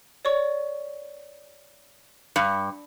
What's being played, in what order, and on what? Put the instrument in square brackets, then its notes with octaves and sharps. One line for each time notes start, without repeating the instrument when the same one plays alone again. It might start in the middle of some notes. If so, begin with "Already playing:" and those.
[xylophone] C#5 D5 C#6
[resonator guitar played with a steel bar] G2 [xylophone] C#7